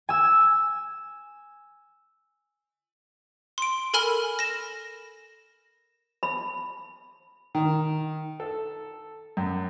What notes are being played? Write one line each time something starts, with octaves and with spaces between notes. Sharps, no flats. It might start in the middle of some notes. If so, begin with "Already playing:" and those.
G#5 E6
C6 D7
A4 A#4 G#5 B5 F6
A#6 E7
B5
D#3
A4
F#2